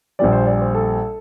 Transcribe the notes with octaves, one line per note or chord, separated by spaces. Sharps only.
A#1 A#2 G3 D5
C5
D5
C5
A4